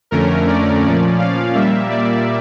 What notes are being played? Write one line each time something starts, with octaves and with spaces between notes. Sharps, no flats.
F2 D3 A3 C#4 A#4
D5
A#2 F3 C#4 D5
F5
A#2 G3 A#3 E5
D5